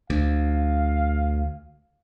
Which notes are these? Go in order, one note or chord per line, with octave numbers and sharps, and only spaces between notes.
D2 F5